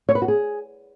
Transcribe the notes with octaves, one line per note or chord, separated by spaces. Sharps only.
C#5
B4
F#4
G#4